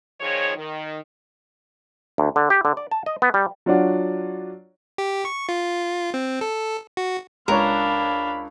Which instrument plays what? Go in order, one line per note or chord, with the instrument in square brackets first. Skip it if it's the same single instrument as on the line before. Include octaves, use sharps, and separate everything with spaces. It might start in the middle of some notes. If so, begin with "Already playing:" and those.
[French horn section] A#2 D#3 F3 G#4 C#5
D#3
[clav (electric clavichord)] D2
D3
G4
D3
D5
A5
D#5
B3
G3
[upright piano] F#3 D4 F4 C#5 D5 F#5
[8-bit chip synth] G4
C#6
F4
C4
A4
F#4
[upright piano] C#2 C#5 [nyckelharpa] D4 F5 [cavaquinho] A#4 [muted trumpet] B5